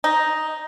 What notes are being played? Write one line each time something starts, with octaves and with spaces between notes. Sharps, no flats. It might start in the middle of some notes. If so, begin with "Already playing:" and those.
D#4